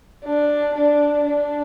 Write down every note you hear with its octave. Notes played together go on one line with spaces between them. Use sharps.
D4
D4
D4